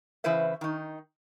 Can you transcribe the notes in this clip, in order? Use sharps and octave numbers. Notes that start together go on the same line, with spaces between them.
C#3 E3 E4 B4 C5 E5
D#3 D#4